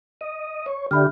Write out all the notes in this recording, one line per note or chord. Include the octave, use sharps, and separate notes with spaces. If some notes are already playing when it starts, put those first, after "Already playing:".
D#5
C#5
D3 G4 E5 B5 F6